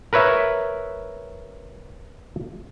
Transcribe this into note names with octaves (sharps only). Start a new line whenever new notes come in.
A#4 B4 C#5 E5